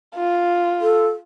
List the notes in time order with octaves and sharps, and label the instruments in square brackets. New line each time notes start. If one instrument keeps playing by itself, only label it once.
[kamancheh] F4
[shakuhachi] A4